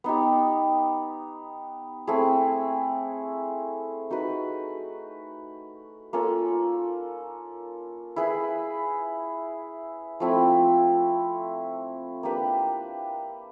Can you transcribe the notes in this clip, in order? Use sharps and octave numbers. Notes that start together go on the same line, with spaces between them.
B3 D#4 G4
A3 C4 E4 G#4
D#4 F#4 B4
A#3 C#4 F4 A4
E4 G#4 B4
F3 A3 C4 E4
A#3 D4 G4 B4